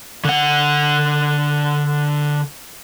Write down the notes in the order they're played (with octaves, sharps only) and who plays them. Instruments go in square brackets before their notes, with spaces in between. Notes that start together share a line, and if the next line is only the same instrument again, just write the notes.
[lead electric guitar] D3 F#5